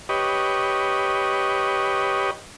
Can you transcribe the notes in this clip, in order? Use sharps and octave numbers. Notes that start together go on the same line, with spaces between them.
G4 B4 C#5 D#5